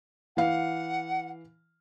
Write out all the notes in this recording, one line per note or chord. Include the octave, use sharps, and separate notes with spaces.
E3 F5 F#5